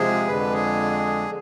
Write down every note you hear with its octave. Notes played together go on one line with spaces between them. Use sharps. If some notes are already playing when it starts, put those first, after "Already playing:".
Already playing: C3 F3 G#3 G#4
F2 D3 G#3 B4
G#4